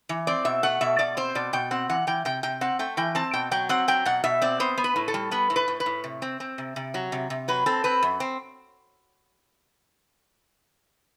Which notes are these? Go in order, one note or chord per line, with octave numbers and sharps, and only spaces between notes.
E3
C4 D5
B2 E5
A3 F#5
B2 E5
B2 D5
C4 C5
B2 D5
B2 G5
C4 F#5
E3 F#5
E3 G5
C3 G5
C3 G5
C4 F#5
A3 G5
E3 G5
C4 A5
B2 G5
F#3 G5
C4 F#5
F#3 G5
B2 F#5
B2 E5
C4 D5
B3 C5
B3
B4
A2
A4
G3
B3 B4
A2
B4
A2
B4
A2
C3
C4
C4
C3
C3
F#3
C3
C3
F#3 B4
C4 A4
C4 B4
F#2
C4